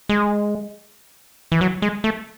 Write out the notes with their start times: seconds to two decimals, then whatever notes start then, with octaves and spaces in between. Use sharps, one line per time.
0.09 G#3
1.52 E3
1.61 F#3
1.82 G#3
2.04 A3